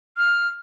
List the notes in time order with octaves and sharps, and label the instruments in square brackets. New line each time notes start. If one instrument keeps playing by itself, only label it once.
[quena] F6